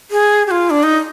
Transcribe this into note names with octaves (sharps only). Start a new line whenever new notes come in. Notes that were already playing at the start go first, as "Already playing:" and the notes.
G#4
G4
F4
D4
D#4